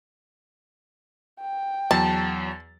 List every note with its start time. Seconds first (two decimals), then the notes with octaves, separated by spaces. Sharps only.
1.41 G5
1.91 E2 F#3 A5 A6